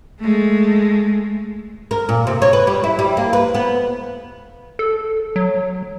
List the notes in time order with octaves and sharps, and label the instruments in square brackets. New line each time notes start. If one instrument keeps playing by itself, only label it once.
[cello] G#3 A3
[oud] A#4
A#2
C3
C#5
B4
G3
E4
G3
A#3
B4
B3
[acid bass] A4
F#3